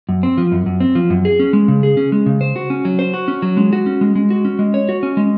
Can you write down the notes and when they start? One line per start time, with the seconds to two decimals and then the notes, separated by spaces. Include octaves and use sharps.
0.09 F#2
0.23 C4
0.38 F3
0.52 F#2
0.66 F#2
0.80 C4
0.95 F3
1.10 F#2
1.25 G#4
1.40 C#4
1.53 G#3
1.68 C#3
1.83 G#4
1.97 C#4
2.12 G#3
2.26 C#3
2.41 C5
2.56 F#4
2.70 C#4
2.85 F#3
2.99 C5
3.14 F#4
3.28 C#4
3.42 F#3
3.57 G#3
3.73 F#4
3.86 C#4
4.01 G#3
4.16 G#3
4.30 F#4
4.45 C#4
4.59 G#3
4.74 C#5
4.89 F#4
5.03 C#4
5.17 G#3